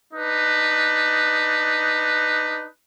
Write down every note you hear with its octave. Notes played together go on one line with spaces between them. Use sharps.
D4 D#4 B4